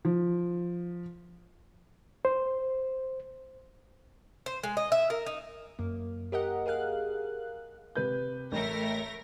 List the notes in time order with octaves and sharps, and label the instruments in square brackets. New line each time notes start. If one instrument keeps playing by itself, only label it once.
[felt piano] F3
[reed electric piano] C5
[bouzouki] C5
G#3
D#5
E5
A#4
D#4
[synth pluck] F#2 A#3
G4 A#4 D#5 F#5
G#4 A#4 F5 F#6
[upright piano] C3 B4 G6
[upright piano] A1 [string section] A3 A#4 A#6